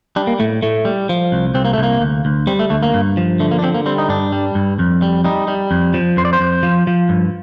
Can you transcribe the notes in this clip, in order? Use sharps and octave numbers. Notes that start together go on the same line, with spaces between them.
G3 D4
A#3
A2 A3
A2 A3
G3
F3
C2
C2 C4
A#3
A3
C2 A#3
D2
D2
G3 C4
A3
D2 A3
A#3
G2
F3
D3 A3
A#3
D4
D3 C4
A#3
G3 C4
D#4
G2 D4
G3
G2
F2
G3
G3 D#4
G3
F2
F3
F2 C5
D5
C5
F2
F3
F3
G2